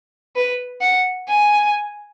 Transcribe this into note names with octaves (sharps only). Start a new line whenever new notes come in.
B4
F#5
G#5